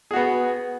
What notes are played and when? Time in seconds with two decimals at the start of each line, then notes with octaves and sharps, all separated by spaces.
0.11 G#4
0.13 F#4
0.16 B3